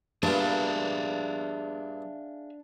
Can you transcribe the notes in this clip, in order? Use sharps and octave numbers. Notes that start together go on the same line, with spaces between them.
G2 A#2 B3 D4 G#4 E5 F5